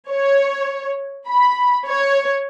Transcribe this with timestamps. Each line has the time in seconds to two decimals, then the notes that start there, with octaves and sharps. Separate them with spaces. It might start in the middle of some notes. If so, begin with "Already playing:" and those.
0.10 C#5
1.29 B5
1.87 C#5